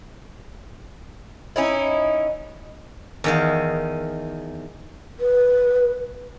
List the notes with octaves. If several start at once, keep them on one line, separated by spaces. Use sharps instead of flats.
C#4 D#4 E4
E2 D#3 F5
B4